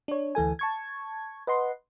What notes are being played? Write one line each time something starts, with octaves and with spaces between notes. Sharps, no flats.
D4 C#5
D2 E3 A4 G#5
A5 C#6 G#6
B4 D#5 F#5 C6